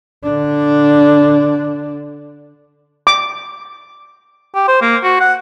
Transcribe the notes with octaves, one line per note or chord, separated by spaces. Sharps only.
D3 D4
D6
G4
C5
A#3
F#4
F#5